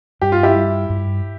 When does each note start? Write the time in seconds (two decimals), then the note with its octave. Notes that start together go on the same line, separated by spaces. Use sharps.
0.21 G2 G4
0.32 F4
0.43 E4 G4
0.56 G3
0.90 G2